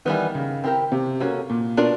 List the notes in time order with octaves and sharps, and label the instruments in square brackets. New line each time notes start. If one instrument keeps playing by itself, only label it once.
[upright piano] D#3 [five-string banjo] E3 G3 B3
[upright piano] C#3
[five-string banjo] C4 E4 G4 A#4
[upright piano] C3
[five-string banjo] A#3 C#4 F#4 A4
[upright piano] A#2
[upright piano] B2 [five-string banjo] D4 F4 A#4 D5